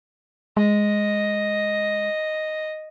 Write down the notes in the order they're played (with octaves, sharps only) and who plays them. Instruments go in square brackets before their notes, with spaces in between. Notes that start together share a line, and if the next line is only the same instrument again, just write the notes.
[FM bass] G#3 [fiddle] D#5